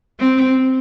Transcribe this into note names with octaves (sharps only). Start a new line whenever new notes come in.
C4